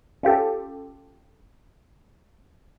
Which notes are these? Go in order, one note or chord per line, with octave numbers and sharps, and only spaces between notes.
C#4 F4 G4 A4